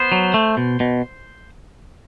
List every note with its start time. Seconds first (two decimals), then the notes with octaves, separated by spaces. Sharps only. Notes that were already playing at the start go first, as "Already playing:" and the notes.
Already playing: B3 C5
0.12 F#3
0.34 A3
0.57 B2
0.80 B2